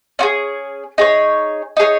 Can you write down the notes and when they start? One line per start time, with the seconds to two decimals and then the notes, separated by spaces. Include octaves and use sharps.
0.19 C#4 F4 G#4
0.98 D#4 G#4 C#5
1.77 D#4 G#4 C#5